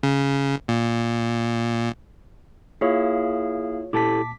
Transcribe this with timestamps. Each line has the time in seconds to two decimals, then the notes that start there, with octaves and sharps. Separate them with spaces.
0.03 C#3
0.68 A#2
2.81 A#3 E4 F4 G#4 C#5 F5
3.93 A#2 E4 G4 A4 A5 D6 B6